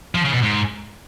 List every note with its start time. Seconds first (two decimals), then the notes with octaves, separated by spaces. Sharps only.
0.15 F3
0.25 C#3
0.34 B2
0.44 G#2